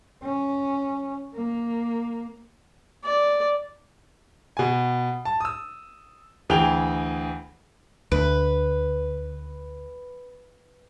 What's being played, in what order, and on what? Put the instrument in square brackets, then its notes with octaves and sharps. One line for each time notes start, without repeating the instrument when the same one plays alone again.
[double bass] C#4
A#3
[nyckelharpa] D5
[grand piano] B2 G#5
A5
D#6 E6
D2 E3 G#4 G5 F7 G7
[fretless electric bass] D2 [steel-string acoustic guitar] B4